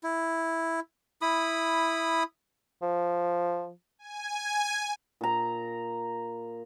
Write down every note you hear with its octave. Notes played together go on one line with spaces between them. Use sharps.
E4
E4 B5 D#6
F3
G#5
A#2 A#5